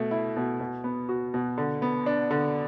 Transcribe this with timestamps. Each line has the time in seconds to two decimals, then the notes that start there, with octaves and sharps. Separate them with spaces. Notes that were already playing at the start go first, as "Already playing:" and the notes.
Already playing: B2 A3
0.11 E4
0.37 B2
0.60 B2
0.84 B3
1.09 F#4
1.34 B2
1.58 D3
1.82 B3
2.06 D4
2.31 D3